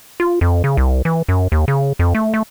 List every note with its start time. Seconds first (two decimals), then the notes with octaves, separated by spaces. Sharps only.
0.20 F4
0.41 F2
0.64 C#3
0.77 C2
1.05 E3
1.29 F#2
1.52 D#2
1.68 C#3
1.99 F2
2.15 A3
2.34 A3